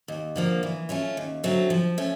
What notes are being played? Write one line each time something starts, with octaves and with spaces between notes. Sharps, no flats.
D#2
D3 F3 A#3
E3
A3 C#4 F4
D#2
D3 F#3 A3 C4
F3
A3 C#4